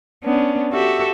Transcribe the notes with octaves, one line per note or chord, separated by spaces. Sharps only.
B3 C#4 D4
F#4 G4 A4 E5